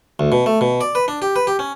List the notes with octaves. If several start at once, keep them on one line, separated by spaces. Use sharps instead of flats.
D2
B2
A3
B2
D5
B4
D4
G4
B4
G4
C#4